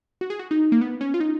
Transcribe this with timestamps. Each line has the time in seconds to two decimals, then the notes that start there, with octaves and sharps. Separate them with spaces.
0.21 F#4
0.30 G#4
0.39 F#4
0.51 D#4
0.72 A#3
0.81 B3
1.01 C#4
1.14 F4
1.20 D#4